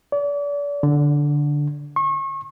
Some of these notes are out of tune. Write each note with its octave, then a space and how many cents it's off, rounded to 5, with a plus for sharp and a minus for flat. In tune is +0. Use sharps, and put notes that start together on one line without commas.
D5 -35
D3 -5
C#6 -35